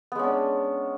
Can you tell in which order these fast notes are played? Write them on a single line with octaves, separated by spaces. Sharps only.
B3 G#3 C#4 D4